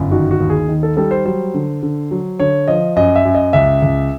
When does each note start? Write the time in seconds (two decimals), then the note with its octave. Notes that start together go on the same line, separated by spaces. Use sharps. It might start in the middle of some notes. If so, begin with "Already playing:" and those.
Already playing: G1 F#2
0.11 D#3 F#4
0.31 F#4
0.40 D#2
0.50 G#4
0.68 D#3
0.83 A4
0.97 G3 A4
1.11 C5
1.26 F#3 C5
1.54 D3
1.83 D3
2.11 F#3
2.40 D3 C#5
2.68 F3 D#5
2.96 F#2 D#5
3.16 E5
3.25 F#2
3.35 D#5
3.53 C#2 E5
3.83 C#2